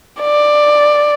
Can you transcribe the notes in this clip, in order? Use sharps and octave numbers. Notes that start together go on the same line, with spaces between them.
D5